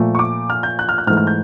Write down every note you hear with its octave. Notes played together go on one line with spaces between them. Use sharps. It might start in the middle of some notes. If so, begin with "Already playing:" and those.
Already playing: A#2 F3 A3
C#6
D6
F6
G6
F#6
F6
F#6
G#2 E3 A3 F6
F6
G6